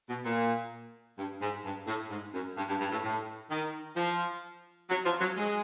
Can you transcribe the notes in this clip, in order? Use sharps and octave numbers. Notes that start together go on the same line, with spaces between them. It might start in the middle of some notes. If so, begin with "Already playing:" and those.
B2
A#2
G2
G#2
G2
A2
G#2
F#2
G2
G2
G2
A2
A2
D#3
F3
F#3
F3
F#3
G#3